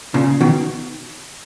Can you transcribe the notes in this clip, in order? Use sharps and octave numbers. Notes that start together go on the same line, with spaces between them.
A#2 C#3
B2 D#3